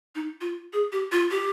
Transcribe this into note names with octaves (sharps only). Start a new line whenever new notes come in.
D#4
F4
G#4
G4
F4
G4